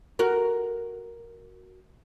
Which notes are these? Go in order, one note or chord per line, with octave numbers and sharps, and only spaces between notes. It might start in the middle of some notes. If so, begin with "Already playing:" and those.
F#4 A#4